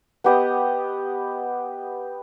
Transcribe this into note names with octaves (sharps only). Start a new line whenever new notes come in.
B3 G4 D#5